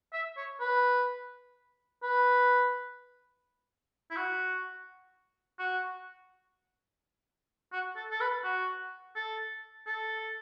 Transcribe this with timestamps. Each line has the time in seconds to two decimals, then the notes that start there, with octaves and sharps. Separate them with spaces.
0.13 E5
0.37 C#5
0.61 B4
2.03 B4
4.11 E4
4.17 F#4
5.59 F#4
7.73 F#4
7.96 A4
8.11 A4
8.20 B4
8.44 F#4
9.16 A4
9.87 A4